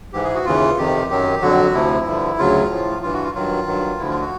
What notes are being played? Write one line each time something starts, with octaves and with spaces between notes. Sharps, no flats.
G#2 E3 G4
G#4
F#4
D#2 C#3 E3 F4
F2 C3 D#3 G4
F#2 D#3 F#3 G4
F2 D3 F#3 F#4
D2 C3 F3 E4
G2 D3 F3
D2 C#3 F#3 F4
A2 F3
G2 E3 F4
F#4
F4
G2 D#3 F#3 F4
G2 D#3 F#3
D2 D3 F3 E4
F4
F#4